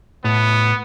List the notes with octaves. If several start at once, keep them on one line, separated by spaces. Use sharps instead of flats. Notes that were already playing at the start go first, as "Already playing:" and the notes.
A2 B3